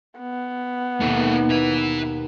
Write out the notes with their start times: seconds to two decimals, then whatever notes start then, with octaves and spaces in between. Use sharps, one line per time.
0.19 B3
1.01 D#2 B2 A#3 A4
1.51 B4 E5